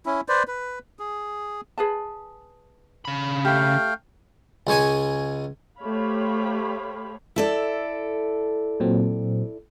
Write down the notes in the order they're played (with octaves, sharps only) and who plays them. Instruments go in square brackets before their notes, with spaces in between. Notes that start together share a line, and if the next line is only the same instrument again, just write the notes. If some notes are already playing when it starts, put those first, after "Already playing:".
[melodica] C#4 E4
B4 C5 D5
B4
G#4
[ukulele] G#4 B4 A5
[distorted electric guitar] C#3 B5
[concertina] A3 F5 G5 [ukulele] G4
[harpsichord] C#2 G#3 C#5 G#5
[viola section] A3 G4 C5 C#5 F5 B5
[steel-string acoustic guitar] E4 A4 D5
[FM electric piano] A#2 F#3 C4